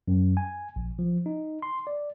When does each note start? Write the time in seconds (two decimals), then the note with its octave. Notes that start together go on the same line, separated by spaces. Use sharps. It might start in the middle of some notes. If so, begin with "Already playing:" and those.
0.08 F#2
0.37 G#5
0.76 A#1
0.99 F3
1.26 D#4
1.62 C6
1.87 D5